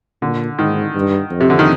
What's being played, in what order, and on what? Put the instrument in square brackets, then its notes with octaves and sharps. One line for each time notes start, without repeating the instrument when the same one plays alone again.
[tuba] A#2 [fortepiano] D3
[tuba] G#2 [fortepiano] D#3
[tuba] G2
F2
[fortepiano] C3
D3
D#3